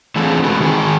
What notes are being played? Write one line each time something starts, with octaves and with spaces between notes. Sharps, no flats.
D3 E3 A3 C4 F4 G#4
G#3 A3 F#4 B4
D#3 G#3 G#4 A#4